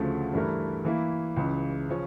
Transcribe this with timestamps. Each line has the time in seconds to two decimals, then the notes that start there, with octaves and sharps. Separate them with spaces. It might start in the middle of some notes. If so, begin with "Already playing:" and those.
Already playing: D2 C#3 F3 A3
0.33 G2 E3 A3 E4 A#4
0.85 E3 A#3 E4
1.36 C#2 C#3 E3
1.89 C#3 F3 C#4